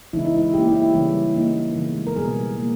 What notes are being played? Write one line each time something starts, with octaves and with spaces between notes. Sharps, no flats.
C#3 E3 G#3 B3 D#4 E4
D#4
E4
E3 A#3 C#4 G4
E4
G4
C#3 E3 G3 C#4
E3 A#3 D#4
C#3 E3 G#3 B3
A#4
B2 G3 B3 G#4
B2 G3 A#3